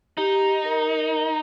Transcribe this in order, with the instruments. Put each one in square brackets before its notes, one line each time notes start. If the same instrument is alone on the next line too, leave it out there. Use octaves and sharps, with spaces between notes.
[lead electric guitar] D#4 [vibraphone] G4
[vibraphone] A#4